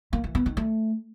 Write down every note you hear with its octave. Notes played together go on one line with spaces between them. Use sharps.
A#3
E3
B3
D#3
A3